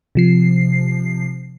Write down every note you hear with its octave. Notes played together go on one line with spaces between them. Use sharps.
C3 F3 C7